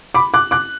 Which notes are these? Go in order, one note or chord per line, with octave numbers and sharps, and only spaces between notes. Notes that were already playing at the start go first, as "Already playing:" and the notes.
B5 D6
D6 F#6
D6 F#6